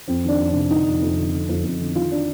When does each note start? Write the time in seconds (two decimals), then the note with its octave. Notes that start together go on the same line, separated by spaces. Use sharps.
0.08 F2 C4
0.24 D#3 D4
0.39 F2
0.50 C3 D4
0.70 D3 D#4
0.87 F2
1.02 F2
1.17 D3
1.33 D3
1.49 F2
1.64 F2
1.80 D3
1.95 D#3 F4
2.11 D4